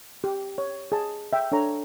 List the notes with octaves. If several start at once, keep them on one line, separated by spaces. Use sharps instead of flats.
G4
C#5
G#4 A5
E5 G5
D4 A4 C#5 A#5